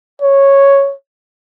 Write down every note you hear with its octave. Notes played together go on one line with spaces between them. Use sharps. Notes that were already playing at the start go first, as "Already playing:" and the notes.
C#5